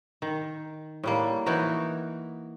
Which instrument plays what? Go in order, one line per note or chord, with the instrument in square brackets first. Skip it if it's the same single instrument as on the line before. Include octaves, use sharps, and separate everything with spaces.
[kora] D#3
A2 G3 A#3
E3 D#4 F#4 A#4